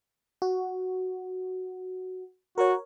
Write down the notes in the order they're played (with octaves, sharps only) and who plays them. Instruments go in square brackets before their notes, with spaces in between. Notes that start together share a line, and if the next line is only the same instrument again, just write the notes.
[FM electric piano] F#4
[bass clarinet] F#4 [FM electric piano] A#4 C#5